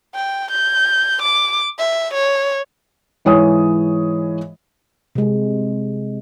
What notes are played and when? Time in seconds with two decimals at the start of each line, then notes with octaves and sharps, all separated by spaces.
0.15 G5
0.51 G6
1.22 D6
1.79 E5
2.13 C#5
3.25 G#2 E3 C#5 G#5 D#6
5.15 C3 G#3